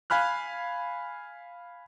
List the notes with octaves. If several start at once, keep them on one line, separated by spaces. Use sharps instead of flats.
F5 G#5 B5 F6 F#6